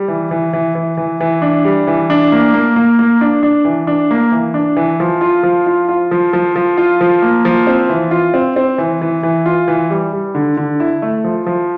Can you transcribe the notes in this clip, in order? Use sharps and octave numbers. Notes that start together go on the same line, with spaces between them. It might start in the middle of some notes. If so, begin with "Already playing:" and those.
Already playing: G3
E3
E3
E3
E3
E3
E3
D4
G3
E3
D4
A#3
A#3
A#3
A#3
D4
D4
E3
D4
A#3
E3
D4
E3
F3
F4
F3
F4
F4
F3
F3
F3
F4
F3
A#3
F3
C4
E3
F4
C4
C4
E3
E3
E3
F4
E3
G3
G3
D3
D3
E4
A3
F3
F3